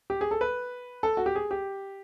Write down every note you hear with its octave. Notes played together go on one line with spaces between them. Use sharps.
G4
G#4
A4
B4
A4
F#4
G4
G#4
G4